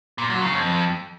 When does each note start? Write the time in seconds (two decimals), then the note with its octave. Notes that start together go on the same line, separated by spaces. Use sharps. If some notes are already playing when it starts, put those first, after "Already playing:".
0.18 A#2
0.30 F#3
0.41 C#3
0.53 F2